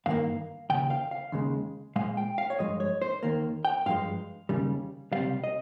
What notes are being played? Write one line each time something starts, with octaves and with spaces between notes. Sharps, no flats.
G2 D#3 A#3 F5
D#2 C#3 G5
F5
F5
D#2 C#3 G#3
A#2 G#3 F5
G5
F5
C#5
G2 F3 G#3 D#5
C#5
C5
D#2 D#3 A#3
G5
G2 F3 G#3 F5
D#2 C#3 G3
C#2 C3 D#3 G3 F5
D#5